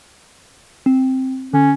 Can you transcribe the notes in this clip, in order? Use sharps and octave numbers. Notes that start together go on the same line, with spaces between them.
C4
D3 C#4